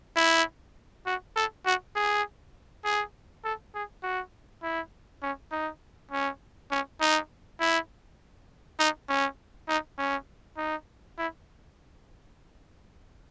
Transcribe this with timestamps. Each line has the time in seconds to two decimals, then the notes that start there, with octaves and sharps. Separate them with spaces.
0.16 E4
1.06 F#4
1.36 A4
1.65 F#4
1.95 G#4
2.85 G#4
3.44 A4
3.74 G#4
4.03 F#4
4.62 E4
5.22 C#4
5.52 D#4
6.11 C#4
6.71 C#4
7.01 D#4
7.60 E4
8.79 D#4
9.09 C#4
9.68 D#4
9.98 C#4
10.57 D#4
11.18 E4